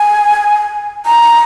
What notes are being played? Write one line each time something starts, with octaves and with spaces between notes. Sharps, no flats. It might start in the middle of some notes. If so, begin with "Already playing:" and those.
Already playing: G#5
A#5